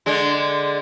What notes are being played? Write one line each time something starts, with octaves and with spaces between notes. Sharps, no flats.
D3 G#3